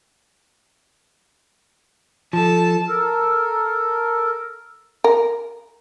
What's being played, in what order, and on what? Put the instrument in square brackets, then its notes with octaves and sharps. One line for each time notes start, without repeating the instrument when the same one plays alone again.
[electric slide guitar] F3 [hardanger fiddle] A4 A5
[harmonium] A4 A#4
[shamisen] A#4